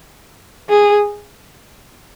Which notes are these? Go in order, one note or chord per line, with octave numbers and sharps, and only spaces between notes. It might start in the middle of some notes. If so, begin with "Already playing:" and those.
G#4